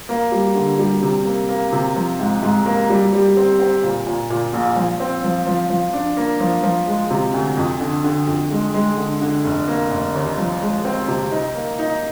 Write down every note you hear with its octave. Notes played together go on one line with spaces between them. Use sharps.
A#3
G3
D3
G3
C3
A#3
A#3
C3
F3
G#2
G#2
A#3
G3
G3
C4
C4
A#2
A#2
A#2
A#1
F3
C4
F3
F3
F3
D4
A#3
F3
F3
G#3
C3
D2
F2
D3
D3
F2
G#3
G#3
D3
D3
F1
A#3
F1
D#2
F3
G#3
C4
C3
D#4
A#3
D#4